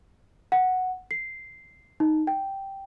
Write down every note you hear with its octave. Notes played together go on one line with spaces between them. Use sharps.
F#5
C7
D#4
G5